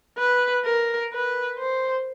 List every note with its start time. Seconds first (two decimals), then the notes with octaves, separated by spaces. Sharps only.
0.18 B4
0.65 A#4
1.12 B4
1.58 C5